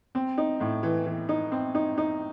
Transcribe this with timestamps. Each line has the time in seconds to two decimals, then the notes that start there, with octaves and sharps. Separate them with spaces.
0.15 C4
0.38 D#4
0.60 A2
0.83 E3
1.06 E3
1.29 D#4
1.52 C4
1.75 D#4
1.98 D#4